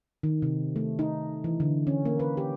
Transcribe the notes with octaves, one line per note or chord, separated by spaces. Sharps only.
D#3
C3
A3
D#4
E3
D3
C#4
A#3
B4
G4